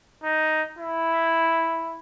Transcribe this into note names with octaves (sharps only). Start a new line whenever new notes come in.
D#4
E4